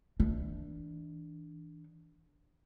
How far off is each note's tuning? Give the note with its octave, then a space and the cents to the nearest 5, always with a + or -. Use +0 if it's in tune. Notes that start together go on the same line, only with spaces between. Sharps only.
E3 -25 D4 +0